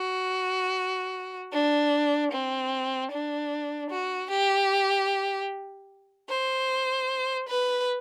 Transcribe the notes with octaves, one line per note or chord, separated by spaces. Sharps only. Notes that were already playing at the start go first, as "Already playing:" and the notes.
Already playing: F#4
D4
C4
D4
F#4
G4
C5
B4